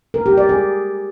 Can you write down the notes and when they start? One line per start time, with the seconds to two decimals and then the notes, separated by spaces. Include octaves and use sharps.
0.14 A#4
0.26 G4
0.37 D5
0.49 G#4